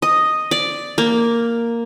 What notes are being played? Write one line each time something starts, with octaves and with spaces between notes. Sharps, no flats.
D#5
D5
A#3